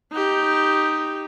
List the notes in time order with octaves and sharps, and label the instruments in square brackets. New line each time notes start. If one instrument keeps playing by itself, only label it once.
[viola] D#4 G4